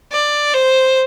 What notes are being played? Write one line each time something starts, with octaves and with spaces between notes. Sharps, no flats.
D5
C5